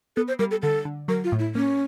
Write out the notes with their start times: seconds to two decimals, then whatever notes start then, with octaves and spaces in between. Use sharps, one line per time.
0.16 B3 A4
0.28 C5
0.39 G3 A#4
0.51 A4
0.62 D3 A4
0.85 D3
1.08 F#3 A#4
1.24 F4
1.32 A2
1.39 E4
1.55 A#3 C#4